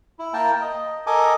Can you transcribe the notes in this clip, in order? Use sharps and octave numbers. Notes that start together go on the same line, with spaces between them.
E4
A#3 A#4 G5 A5
D#5
A4 A#4 D#5 G#5 D6